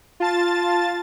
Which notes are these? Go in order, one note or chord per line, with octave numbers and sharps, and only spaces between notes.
F4 A5 A6